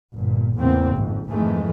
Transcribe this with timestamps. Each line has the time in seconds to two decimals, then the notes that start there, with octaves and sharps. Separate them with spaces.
0.13 G1 A#2
0.57 E2 A2 C#3 A#3 C4
0.97 G#1 F2
1.29 G#1 F2 D#3 E3 G#3 A3